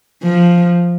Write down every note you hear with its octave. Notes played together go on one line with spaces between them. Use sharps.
F3